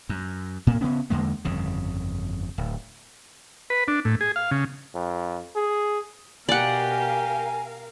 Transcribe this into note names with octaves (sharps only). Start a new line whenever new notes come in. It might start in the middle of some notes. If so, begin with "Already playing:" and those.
F#2
A2 A#3
C#3 B3 C#4
E2 D3 G#3 A#3
G1 F2 C#3
D1
B4
D4
A2
G#4
F5
C#3
F2
G#4
B2 G4 A#4 D5 F5 F#5 G#5